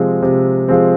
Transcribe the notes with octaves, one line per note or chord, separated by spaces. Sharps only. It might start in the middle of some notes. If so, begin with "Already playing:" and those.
Already playing: C3 F3 G#3 C4
C3
F3 G#3 C4